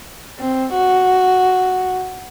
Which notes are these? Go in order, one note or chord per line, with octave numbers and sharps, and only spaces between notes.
C4
F#4